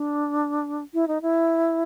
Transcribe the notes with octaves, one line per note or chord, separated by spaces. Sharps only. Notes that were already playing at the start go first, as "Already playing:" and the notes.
Already playing: D4
E4
D#4
E4